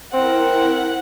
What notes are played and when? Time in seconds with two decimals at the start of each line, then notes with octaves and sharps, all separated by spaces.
0.13 C4 E4 A#4 F#5